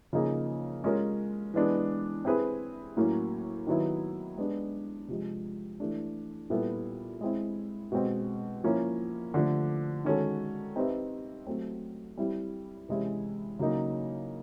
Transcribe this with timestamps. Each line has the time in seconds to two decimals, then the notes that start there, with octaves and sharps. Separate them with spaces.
0.13 C#3 F3 A#3 D#4 G#4
0.84 G#3 C#4 F4 A#4
1.54 E3 G#3 B3 D4
2.25 C4 E4 G#4 B4
2.97 A2 F#3 A#3 C#4
3.67 D#3 F#3 B3 E4
4.37 G#3 B3 D4
5.08 C3 F3 G#3
5.80 E3 A3 D4
6.50 A#2 G3 B3 E4 A4
7.21 G#3 C4 E4
7.92 B2 G#3 C4
8.64 F3 A#3 C#4 E4
9.34 D3 F3 A3 D4
10.05 D#3 G#3 C#4 F#4 A4
10.76 C4 D#4 G4 B4 E5
11.47 F#3 A3 C4
12.17 G3 C4 E4
12.89 C3 E3 G#3 C#4 E4
13.59 C#3 F#3 A#3 D#4